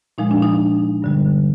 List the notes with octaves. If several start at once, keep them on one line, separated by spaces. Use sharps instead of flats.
A#2 F3 G#3 D#4
D4
D#4
G2 D3 G3